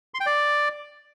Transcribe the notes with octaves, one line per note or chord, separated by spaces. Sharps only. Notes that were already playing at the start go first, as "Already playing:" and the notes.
C6
G5
D5